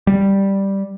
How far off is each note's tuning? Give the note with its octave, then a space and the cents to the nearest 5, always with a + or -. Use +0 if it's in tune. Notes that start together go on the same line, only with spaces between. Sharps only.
G3 +0